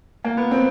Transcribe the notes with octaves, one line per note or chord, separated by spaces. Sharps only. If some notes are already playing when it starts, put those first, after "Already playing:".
A#3
B3
C4